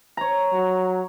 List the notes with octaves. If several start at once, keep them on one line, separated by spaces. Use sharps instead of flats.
C#5 A#5
F#3